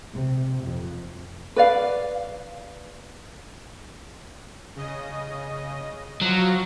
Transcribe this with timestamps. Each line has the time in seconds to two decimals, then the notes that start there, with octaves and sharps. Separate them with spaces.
0.14 C3
0.63 F2
1.56 B4 D5 F5
4.75 C#3 D#5
6.21 F3 F#3 F4 F#4